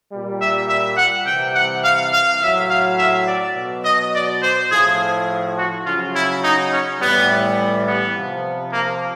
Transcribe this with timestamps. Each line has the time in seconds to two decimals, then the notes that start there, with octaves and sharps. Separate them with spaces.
0.11 A#2 G3
0.41 E5
0.69 E5
0.97 F#5
1.27 C3 E3 G3 G5
1.55 F#5
1.84 F5
2.13 F5
2.41 A2 F#3 E5
2.71 F5
2.99 E5
3.27 D5
3.56 B2 F#3
3.85 D#5
4.14 D5
4.42 C5
4.71 A2 F3 G#4
5.57 F#4
5.86 C#3 F#3 F4
6.14 E4
6.44 D#4
6.72 C#4
7.01 A2 E3 G3 B3
7.88 B3
8.16 C3 F3
8.73 A#3